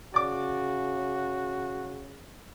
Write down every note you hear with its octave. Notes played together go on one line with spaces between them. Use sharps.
C#3 F#4 D5 D6